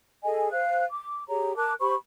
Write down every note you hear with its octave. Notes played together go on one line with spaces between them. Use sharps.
G#4 A4 D#5 G#5
C5 F5 F#6
D6
G4 G#4 C#5 A#5
A#4 A5 D6 F#6
G4 C5 B5 C#6